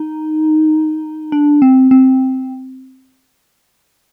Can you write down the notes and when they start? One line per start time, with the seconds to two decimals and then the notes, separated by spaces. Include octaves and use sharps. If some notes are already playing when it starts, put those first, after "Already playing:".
Already playing: D#4
1.32 D4
1.62 C4
1.91 C4